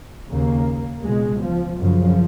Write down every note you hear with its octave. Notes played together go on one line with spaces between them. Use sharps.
D#2 C#3 A#3
C#2 B2 G#3
F3
F#2 C#3 F3